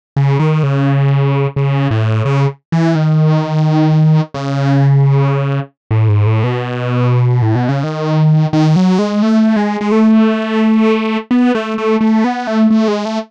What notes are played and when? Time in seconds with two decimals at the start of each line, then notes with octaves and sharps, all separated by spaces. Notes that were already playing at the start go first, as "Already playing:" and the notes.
0.16 C#3
0.39 D#3
0.63 C#3
1.56 C#3
1.91 A2
2.25 C#3
2.72 E3
2.95 D#3
4.34 C#3
5.91 A2
6.09 G#2
6.26 A2
6.44 B2
7.42 A2
7.55 B2
7.69 C#3
7.83 D#3
8.53 D#3
8.76 F#3
8.99 G#3
9.22 A3
9.56 G#3
9.81 G#3
9.92 A3
11.31 B3
11.55 A3
11.78 A3
12.01 A3
12.24 B3
12.47 A3
12.70 A3
12.88 G#3
13.05 A3